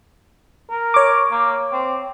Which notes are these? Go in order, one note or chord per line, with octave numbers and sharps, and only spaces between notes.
A#4
C#5 D6
A#3
C4